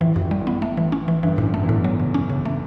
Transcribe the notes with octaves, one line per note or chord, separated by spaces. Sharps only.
A1 A2 E3
F#2
A1 A2
G3
A1 A2
B3
A3
E3
C#4
E3
G1 G2 E3
A2
F#2
A3
E2
A2
F#3
C#3
C#4
C#3
A3